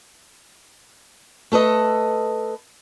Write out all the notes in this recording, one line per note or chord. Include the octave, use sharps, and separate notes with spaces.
A3 A4 B4 D#5